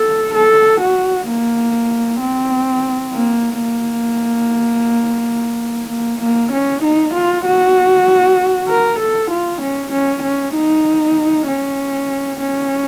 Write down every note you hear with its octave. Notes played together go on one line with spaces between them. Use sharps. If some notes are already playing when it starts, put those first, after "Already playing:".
Already playing: A4
A4
F#4
A#3
C4
A#3
A#3
A#3
A#3
C#4
D#4
F4
F#4
A#4
A4
F4
C#4
C#4
C#4
D#4
C#4
C#4